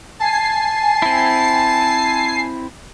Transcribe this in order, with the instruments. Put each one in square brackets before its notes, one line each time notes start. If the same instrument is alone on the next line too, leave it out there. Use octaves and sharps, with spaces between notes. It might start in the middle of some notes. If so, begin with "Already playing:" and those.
[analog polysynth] G#5 C7 [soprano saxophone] A5
[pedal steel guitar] C4 E4